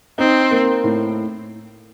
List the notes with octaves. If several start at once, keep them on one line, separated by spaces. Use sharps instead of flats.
C4 D#4
A#3
A2